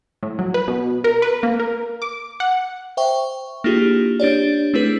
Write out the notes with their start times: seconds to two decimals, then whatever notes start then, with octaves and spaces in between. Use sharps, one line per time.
0.23 A2
0.39 F#3
0.54 B4
0.68 B2
1.04 A#4
1.22 B4
1.43 A#3
1.59 A#4
2.02 D6
2.40 F#5
2.97 C5 E5 G5 C#6
3.64 A#3 D4 E4 F4 G4 G#4
4.20 D4 G4 C#5 D5
4.74 A3 C4 D4 E4 G#4 B4